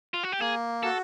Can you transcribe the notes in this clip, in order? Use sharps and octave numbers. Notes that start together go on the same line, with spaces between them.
F4
F#4
G4
A#3 G#4
F#4 A4